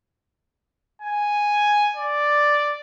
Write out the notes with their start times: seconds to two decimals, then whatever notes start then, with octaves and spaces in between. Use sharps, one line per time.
1.02 G#5
1.96 D5